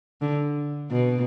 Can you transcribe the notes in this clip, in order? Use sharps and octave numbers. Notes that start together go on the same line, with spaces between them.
D3
B2